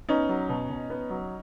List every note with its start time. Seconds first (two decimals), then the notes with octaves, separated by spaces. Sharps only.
0.09 B3 C#4 D#4
0.29 F#3
0.49 B2
0.69 B2
0.90 B3
1.10 F#3